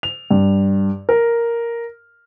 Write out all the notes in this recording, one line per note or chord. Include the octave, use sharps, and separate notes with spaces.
F7
G2
A#4